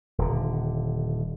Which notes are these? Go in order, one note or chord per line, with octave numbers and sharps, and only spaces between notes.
D#1 D3